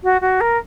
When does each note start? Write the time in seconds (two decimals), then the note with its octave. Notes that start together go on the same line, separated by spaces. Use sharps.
0.03 F#4
0.21 F#4
0.41 A#4